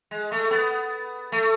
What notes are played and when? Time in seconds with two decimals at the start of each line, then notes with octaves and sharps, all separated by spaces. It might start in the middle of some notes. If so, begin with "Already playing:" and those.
0.11 G#3
0.31 A3
0.51 B3
1.32 A3